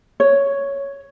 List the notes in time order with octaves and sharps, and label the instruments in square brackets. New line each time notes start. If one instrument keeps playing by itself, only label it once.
[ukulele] C#5